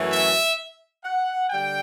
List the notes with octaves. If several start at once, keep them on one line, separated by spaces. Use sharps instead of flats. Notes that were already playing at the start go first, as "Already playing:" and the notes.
Already playing: F#2 E3 A3 C#4
E5
F#5
D3 G3 G5